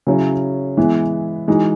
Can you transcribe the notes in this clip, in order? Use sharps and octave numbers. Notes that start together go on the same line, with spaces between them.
C#3 F#3 C#4 E4
E3 G#3 B3 E4
E3 G#3 D#4 F#4